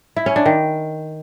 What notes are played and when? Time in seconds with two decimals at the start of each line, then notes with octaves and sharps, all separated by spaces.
0.16 E4
0.26 C#4
0.36 D4
0.46 D#3